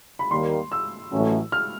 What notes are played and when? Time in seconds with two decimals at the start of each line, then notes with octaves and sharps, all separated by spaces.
0.19 B5
0.31 D#2 D#3 G3 A#3 C6
0.72 E6
1.12 A1 A2 F#3 A3 C#4
1.52 F6